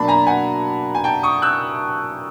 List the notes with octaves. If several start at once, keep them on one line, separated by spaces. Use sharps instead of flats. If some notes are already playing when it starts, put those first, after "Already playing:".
Already playing: B2 F#3 A#3 D4 A5 B5
G#5 A#5
F#5 G#5
G#5
G5 A5
C#6 D#6
E6 F#6